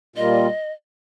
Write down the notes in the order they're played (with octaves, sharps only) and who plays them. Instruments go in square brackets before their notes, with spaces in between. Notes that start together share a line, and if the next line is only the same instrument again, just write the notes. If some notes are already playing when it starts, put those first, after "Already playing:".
[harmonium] A#2 G3 A#3 F4 [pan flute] D#5